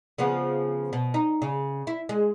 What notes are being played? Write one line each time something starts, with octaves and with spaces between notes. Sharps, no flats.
C#3 F3 B3
B2
D#4
C#3
E4
G#3